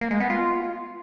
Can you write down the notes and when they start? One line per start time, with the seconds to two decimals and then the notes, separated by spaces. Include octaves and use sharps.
0.01 A#3
0.11 G#3
0.20 B3
0.30 F4